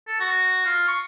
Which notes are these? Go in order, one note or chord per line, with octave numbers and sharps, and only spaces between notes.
A4
F#4
F4
C#6